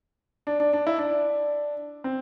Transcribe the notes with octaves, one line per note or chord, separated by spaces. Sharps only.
D4
D4
D4
E4
D4
C4